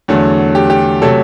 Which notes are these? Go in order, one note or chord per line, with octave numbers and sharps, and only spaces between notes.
E2 D3 F#3 A3
G4
G4
C3 F#3 A3 A4